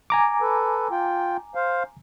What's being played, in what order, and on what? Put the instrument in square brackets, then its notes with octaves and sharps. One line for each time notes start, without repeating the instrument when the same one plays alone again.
[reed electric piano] G#5 A#5 D6
[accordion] A4 B4
F4 G5
C5 F5